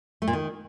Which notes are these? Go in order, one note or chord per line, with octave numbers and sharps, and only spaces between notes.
A3
A#2
D#3